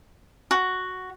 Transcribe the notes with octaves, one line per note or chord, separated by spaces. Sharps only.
F#4